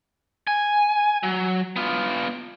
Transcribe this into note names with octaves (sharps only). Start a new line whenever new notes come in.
G#5
F#3
B3 F4